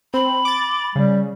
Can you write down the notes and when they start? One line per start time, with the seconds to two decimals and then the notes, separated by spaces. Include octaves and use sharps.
0.14 C4 B5
0.45 D6 A6
0.95 C#3 G3